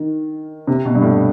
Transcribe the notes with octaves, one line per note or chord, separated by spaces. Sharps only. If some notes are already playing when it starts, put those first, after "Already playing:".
Already playing: D#3
C3
B2
G2
A2